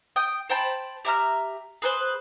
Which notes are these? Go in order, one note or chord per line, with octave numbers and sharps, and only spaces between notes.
G5 D#6 G6
C5 G5 A5 B5
G4 E5 A#5 F6
G#4 B4 C5